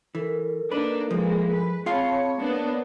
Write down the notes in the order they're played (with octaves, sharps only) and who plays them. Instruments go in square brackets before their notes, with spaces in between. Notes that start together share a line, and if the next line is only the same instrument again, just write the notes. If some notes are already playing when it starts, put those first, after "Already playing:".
[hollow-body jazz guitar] E3 [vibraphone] A4 A#4
[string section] A#3 D4 D#4 [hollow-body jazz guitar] B4
[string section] E3 G#3 A#3 [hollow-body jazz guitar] F3
[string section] B4
[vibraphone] C4 A5 B5 [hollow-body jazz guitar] F4 G#4 F5 [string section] C#5
[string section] A#3 B3 D4 [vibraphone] C#5